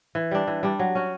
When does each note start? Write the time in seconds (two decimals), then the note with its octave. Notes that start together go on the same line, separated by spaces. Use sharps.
0.15 E3
0.31 G3 D4
0.47 E3
0.63 G3 D4
0.79 F#3
0.95 C#4 F#4